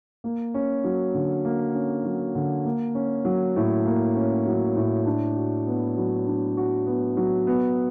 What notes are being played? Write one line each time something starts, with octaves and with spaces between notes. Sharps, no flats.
A#3
C#4
F#3
D3
A#3
C#4
F#3
D3
A#3
C#4
F#3
A2
A#3
C#4
F#3
A2
D4
F#4
B3
F#3
D4
F#4
B3
F#3
B3